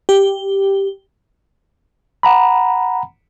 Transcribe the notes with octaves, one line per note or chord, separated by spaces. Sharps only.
G4
F#5 A#5 B5